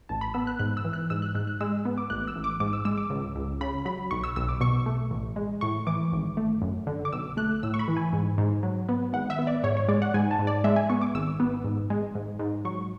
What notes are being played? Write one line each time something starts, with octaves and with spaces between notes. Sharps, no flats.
A1 A5
B5
B3 E6
F#6
G#2 F#6
E6
E3
F#6
G#2 E6
F#6
G#2 F#6
F#6
G#3 E6
B3
D6
A1 F#6
E6
A1
D6
G#2 D6
E6
G#3 E6
D6
C#2
C#2
C#3 B5
F#3 B5
B1 C#6
E6
B1 E6
D6
B2 C#6
A3
A1
G#3
A2 C#6
E3 D6
G#1
A3
F#2
D3
D6
B1 E6
A3 F#6
A2 E6
C#6
B5
E3
G#5
G#2
G#2
F#3
B3
G#1 F#5
E5
B3
D5
G#2 C#5
C#5
G#3 D5
F#5
G#2 G#5
A5
G#2
D5
G#3 E5
G#5
B3 C#6
D6
G#1 E6
B3
G#2
G#3
G#2
G#2
F#3 C#6